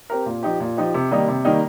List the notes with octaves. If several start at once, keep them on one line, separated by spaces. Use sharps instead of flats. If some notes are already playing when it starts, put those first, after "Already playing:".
C4 G4 A#4
A#2
F3 D#4 G4
A#2
F3 D#4 G4
C3
D#3 G3 A#3 D#4
C3
D#3 G3 A#3 D#4